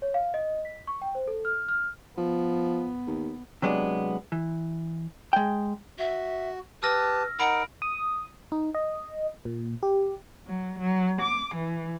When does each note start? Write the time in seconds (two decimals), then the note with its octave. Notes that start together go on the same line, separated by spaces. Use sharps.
0.02 C#5
0.14 F5
0.34 D#5
0.65 B6
0.87 C#6
1.02 G5
1.15 C5
1.28 A4
1.45 F6
1.69 F6
2.18 F3 B3
3.07 D#2
3.62 C3 F#3 G#3 B3 D4
4.32 E3
5.33 G#3 G5
5.98 F#4 E5
6.83 G4 B4 A5 E6 F6 A#6
7.40 D#4 A#4 F#5 B5 D7
7.82 D#6
8.52 D#4
8.74 D#5
9.45 A#2
9.83 G4
10.46 F#3
10.79 F#3
11.21 D6
11.55 E3